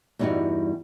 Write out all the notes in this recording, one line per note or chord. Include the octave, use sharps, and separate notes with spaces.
E2 G2 G3 D#4 E4 F#4